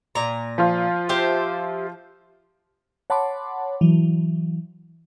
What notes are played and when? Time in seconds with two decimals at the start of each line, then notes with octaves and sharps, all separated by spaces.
0.15 A#2 A#5
0.58 F3 F4
1.09 G4 C5 E5
3.10 C#5 F#5 A5 B5 C6 D6
3.81 E3 F#3